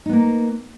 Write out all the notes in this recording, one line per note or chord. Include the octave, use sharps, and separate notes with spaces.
A#3 B3 D#4